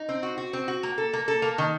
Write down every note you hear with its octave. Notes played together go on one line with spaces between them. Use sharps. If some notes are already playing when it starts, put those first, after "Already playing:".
Already playing: D#4
C4
F#4
F#4
C4
F#4
A#3
A4
A#3
A4
A#3
D#3